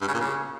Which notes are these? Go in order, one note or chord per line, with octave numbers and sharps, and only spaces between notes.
G2
C#3
A#2
C#3